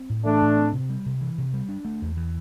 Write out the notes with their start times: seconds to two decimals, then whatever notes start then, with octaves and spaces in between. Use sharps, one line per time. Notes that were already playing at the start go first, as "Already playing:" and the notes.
Already playing: C4
0.10 A2
0.25 E3 A3 D4
0.42 A2
0.57 C4
0.73 C3
0.89 G3
1.06 C3
1.21 E3
1.38 C3
1.54 G3
1.69 D4
1.85 A3
2.02 E2
2.17 E3